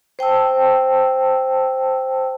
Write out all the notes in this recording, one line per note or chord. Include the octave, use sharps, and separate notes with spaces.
C5 G5 A5 E6